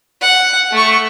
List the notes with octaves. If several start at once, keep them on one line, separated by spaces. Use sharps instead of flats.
F#5
A3 C#6